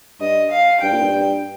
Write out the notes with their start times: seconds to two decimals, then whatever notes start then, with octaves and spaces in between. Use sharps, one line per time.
0.21 G2 D#5
0.51 F5
0.82 G2 G5
0.92 A#2
1.02 G2